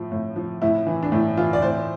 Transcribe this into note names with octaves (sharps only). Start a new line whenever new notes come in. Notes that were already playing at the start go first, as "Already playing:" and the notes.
Already playing: A2 F3
A2
F3
A2 E4
E3
D4
A2 E4
E3 F4
D5
A2 C5